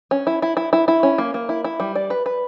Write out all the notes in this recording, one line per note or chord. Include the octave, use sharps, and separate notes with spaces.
C#4
E4
E4
E4
E4
E4
C#4
A#3
A#3
E4
E4
G3
D5
B4
B4